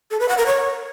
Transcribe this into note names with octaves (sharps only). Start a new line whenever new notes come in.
A4
B4
F#5
A#4
C#5